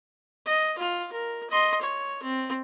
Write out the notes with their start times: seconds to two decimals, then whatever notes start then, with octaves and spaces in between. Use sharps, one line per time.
0.46 D#5
0.78 F4
1.12 A#4
1.50 D#5 C6
1.81 C#5
2.23 C4